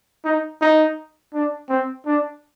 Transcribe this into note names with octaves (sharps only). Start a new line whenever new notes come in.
D#4
D#4
D4
C4
D4